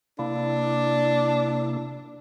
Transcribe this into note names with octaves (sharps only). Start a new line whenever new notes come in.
C3 A#3 D4 E4